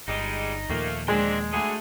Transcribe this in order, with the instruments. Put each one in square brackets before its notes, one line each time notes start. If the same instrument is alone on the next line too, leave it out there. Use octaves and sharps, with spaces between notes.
[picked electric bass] G1 [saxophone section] G3 G#3 [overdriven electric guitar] D#4
[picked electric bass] D#2 A#2 F3 [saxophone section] A3 A#3
[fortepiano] G#3 [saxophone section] C4 D4 [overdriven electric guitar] D#5 G5
[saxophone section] D2 F#4 G#4 [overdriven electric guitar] A3